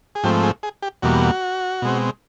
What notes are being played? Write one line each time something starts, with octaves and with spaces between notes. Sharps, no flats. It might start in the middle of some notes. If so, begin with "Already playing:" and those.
G#4
G#2 F3 A3 C4 G4
G#4
G#4
G4
E2 B2 G3 A#3 F#4
B2 G#3 C4